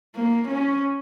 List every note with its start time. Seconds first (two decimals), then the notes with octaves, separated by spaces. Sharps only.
0.15 A#3
0.48 C#4